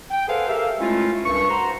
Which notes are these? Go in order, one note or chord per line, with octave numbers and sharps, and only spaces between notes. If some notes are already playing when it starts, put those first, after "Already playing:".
G5
G#4 A4 B4 C5 F5 F#5
G4 A4 A#4 E5 F5
G#3 A3 C#4 E4 F4
C2 G2 C#6
F#4 C5 A#5